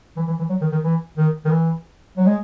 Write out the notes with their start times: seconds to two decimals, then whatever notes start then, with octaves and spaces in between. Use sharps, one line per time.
0.17 E3
0.28 E3
0.39 E3
0.49 F#3
0.61 D#3
0.72 D#3
0.84 E3
1.17 D#3
1.45 D#3
1.51 E3
2.17 F#3
2.26 G#3